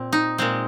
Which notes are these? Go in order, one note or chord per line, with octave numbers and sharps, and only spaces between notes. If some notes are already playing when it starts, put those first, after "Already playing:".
Already playing: A#2 C4
D#4
A#2 G#3 C4